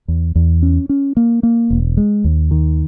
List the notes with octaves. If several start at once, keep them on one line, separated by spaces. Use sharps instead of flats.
E2
E2
C#4
C#4
A#3
A#3
E1
G#3
D#2
D#3